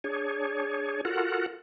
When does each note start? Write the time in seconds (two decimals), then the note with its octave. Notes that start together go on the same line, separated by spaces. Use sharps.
0.04 D4 G#4 C#5
1.05 F4 F#4 A4 A#4 F#5